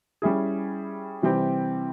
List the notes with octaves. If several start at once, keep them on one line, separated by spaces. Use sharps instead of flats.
G3 C#4 E4 G#4
C3 E3 G3 C4 G4